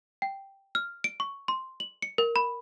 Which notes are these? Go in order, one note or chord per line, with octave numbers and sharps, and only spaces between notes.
G5
F6
D7
C#6
C6
F#7
C#7
A#4
B5